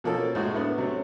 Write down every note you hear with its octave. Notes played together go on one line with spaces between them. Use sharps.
B2 F3 A#3 C#4 F#4 A4
A2 C3 G#3 F#4
A3 B3 D4
C3 F#3 A3 C#4